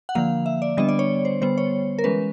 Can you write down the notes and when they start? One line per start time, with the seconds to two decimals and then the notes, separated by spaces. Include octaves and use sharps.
0.09 F#5
0.15 D3 F3 A#3 F5
0.46 E5
0.62 D5
0.77 D3 G3 B3 D4 D#5
0.89 D5
0.99 C#5
1.25 C5
1.41 D3 G3 B3 C5
1.58 C#5
1.99 A#4
2.04 E3 G#3 C#4 B4